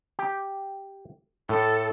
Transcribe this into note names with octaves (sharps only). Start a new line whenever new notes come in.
G4
A2 A4